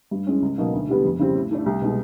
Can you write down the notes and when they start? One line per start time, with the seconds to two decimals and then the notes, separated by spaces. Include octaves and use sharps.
0.11 G2
0.27 E3 G#3 C#4
0.42 C#2
0.58 B2 F#3 A#3 D#4
0.73 D2
0.89 C3 E3 G3 B3
1.04 F2
1.19 C#3 E3 G3 C4
1.35 A2
1.51 E3 A3 D4
1.66 C2
1.82 B2 G#3